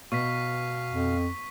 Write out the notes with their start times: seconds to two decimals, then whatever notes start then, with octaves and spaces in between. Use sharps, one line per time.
0.12 B2 F5 C#6 B6
0.91 F2